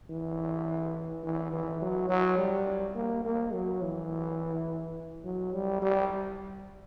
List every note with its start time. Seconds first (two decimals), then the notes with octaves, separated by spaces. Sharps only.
0.10 E3
1.23 E3
1.53 E3
1.82 F#3
2.09 F#3
2.38 G3
2.95 A#3
3.25 A#3
3.53 F#3
3.82 E3
5.24 F#3
5.53 G3
5.82 G3